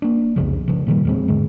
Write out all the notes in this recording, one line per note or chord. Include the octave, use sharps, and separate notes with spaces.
A#3 D4
C2 F2 C#3 F3
C#3 F3
A#2 D#3 F3 G3
E2 G#3 C4
G#2 D3 G#3